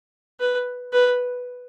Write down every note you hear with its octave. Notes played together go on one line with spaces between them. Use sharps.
B4
B4